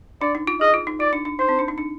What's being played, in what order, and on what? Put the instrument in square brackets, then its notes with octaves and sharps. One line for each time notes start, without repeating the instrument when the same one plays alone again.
[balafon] D4 [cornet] D5
[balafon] D#4
F4
[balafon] G#4 [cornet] D#5
[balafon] F4
D#4
[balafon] F4 [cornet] D5
[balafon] D4
D4
[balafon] D#4 [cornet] C5
[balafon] C4
D4
D#4
D4